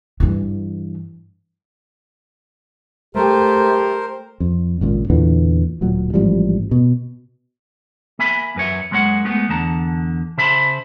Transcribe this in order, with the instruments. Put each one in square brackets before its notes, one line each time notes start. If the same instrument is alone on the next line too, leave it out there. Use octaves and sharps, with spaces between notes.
[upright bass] G2 E3
[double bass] A3 [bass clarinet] G4 [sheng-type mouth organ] A#4 C5
[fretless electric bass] F2
G#1 C#2 A#2
E2 A#2 D3 E3
D1 A#2 F#3
A1 G#2 F3 G3
B2
[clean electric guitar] A#3 E5 G#5 B5
F#2 B4 C#5 E5
F#2 G#3 A#3 C#5 F#5
G#3 A3 B3
E2 D3 A5 A#5
C#3 C5 E5 A5 B5 C6